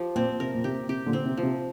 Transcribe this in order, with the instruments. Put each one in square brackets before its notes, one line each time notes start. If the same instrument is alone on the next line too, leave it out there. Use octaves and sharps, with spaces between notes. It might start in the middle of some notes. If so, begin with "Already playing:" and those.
Already playing: [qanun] F3 G4
[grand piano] A#2 [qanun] C4
[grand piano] C3 [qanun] A#4
[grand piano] A#2
[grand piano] C3 [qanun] G4
[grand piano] C3 [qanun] G4
[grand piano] A#2 D3
[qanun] C4
[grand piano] C3
[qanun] F3
[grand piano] C3